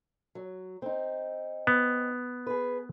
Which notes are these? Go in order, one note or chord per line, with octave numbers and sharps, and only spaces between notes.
F#3
C4 D#4
B3
G#4 B4